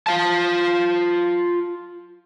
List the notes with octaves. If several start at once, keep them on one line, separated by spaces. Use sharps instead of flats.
F4 F5 A5